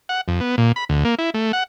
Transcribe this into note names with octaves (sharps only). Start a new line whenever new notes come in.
F#5
F2
B3
A#2
B5
D2
A#3
E4
A3
F#5